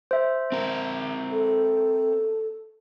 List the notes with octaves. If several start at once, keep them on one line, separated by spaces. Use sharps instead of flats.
C5 E5
C4 A#4
A4